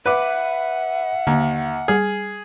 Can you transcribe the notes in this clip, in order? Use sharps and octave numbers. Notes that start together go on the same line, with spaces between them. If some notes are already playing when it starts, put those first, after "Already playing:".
B4 E5 F#5 D6
D#2 D3
G3 G#4 F6